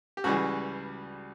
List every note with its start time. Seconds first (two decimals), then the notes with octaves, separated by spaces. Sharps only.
0.17 G4
0.24 C#2 C#3 E3 G3 F#4